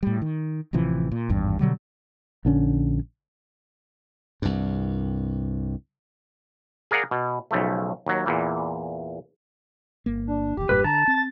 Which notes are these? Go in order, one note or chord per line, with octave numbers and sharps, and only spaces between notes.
A2 G3
D#3
A1 C3 E3 F3
A#2
G#1 E2 G2
B2 D3 F#3 G3
A#1 D3 C#4
C2 G2
G#4 A#4 D5 F5 F#5 A#5
B2
B1 C#3 F3 A3
D#2 F#3
E2 A#2 E3
G1 A#3
D4
D#1 E2 G4
E1 G2 A#2 B4
D3 A5 A#5
C4 A6